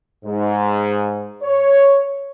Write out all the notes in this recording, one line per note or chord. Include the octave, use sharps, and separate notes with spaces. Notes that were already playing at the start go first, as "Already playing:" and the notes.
G#2
C#5